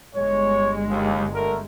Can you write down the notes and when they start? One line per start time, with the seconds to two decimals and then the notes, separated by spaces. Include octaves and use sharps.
0.14 G1 G#3 C#5
0.88 D#2
1.31 D3 A3 A#4